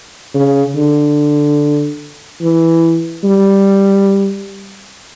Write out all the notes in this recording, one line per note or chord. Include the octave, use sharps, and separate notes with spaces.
C#3
D3
E3
G3